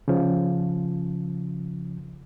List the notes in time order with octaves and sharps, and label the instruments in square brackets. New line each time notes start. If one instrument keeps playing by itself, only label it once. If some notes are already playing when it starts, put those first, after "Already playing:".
[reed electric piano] C#3 F3